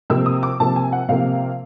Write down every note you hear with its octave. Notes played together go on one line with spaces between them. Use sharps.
C3 F3 A#3 E6
D#6
D6
C3 F3 A#3 A5
G#5
F#5
C3 F3 A#3 F5